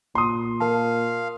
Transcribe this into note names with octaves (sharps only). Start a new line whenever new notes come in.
A#2 C6 D#6
A#4 F5 A5